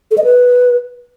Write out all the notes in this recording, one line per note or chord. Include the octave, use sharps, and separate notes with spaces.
A4
D#5
B4